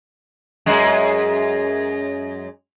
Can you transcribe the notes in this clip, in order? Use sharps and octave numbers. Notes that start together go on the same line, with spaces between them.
F#2 G#3